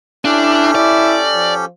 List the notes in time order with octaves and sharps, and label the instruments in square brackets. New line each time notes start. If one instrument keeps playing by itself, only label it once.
[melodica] C#4 G4 A4 [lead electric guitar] D4 [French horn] E4
[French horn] E4 [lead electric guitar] D5
[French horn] F3